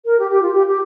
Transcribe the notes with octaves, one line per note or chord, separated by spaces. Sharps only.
A#4
G4
G4
F4
G4
G4